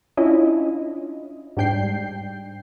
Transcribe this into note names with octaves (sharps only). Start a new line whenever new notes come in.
C#4 D4 E4 F4 D#5
G#2 G3 D4 G5 G6 C7